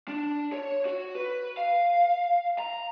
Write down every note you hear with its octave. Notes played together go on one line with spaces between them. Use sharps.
D4
C#5
F#4
B4
F5
A#5